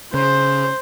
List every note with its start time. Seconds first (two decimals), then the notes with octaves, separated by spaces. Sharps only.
0.14 C#3 C5